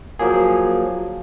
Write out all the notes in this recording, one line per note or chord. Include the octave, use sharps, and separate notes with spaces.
F3 F#3 A#3 G#4